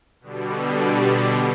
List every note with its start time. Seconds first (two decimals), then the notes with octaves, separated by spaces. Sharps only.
0.21 B2 D3 G3